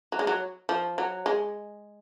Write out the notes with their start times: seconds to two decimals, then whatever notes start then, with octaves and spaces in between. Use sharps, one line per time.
0.12 F#3
0.19 G#3
0.27 F#3
0.69 F3
0.98 F#3
1.26 G#3